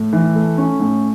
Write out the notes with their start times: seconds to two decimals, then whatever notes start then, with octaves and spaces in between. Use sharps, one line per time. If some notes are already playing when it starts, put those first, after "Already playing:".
Already playing: A2
0.13 E3
0.35 A3
0.58 C#4
0.80 A2